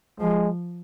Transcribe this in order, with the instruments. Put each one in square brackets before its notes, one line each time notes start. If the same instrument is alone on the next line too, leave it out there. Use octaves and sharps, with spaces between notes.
[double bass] F3 [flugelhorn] G#3